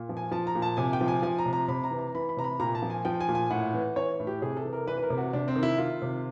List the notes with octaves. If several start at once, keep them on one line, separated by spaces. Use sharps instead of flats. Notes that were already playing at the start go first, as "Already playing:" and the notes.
Already playing: A#2
F3
G#5
F3 A5
A#5
A#2
A5
C3 G#5
G5
F3
G#5
F3 G#5
A#5
C3
A#5
C3 B5
A#5
E3
A#5
E3 B5
B5
C3 A#5
B5
A#2 A#5
A5
F3
G#5
F3 G5
G#5
A#2
G#5
A2 F#5
E3
E3 C#5
A2
G4
C3 G#4
A4
E3
A#4
E3 B4
B4
A#4
C3
F#4
C3 D4
C4
D#3
E4
D#3 F4
C3